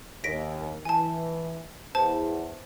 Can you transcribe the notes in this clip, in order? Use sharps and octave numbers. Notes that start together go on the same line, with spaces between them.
D#2 A#6 B6 D7
E3 G#5 A5
E2 C5 A5